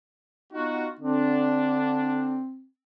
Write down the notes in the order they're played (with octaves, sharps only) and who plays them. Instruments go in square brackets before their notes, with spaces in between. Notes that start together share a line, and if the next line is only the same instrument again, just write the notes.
[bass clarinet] B3 [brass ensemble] D#4 F4 F#4
[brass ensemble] D3 D4 [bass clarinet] C4